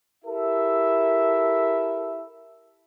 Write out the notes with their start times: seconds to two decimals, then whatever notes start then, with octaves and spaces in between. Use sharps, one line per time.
0.25 E4 G4 A4 A#4 E5